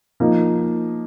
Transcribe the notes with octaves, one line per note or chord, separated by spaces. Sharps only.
F3 A#3 D#4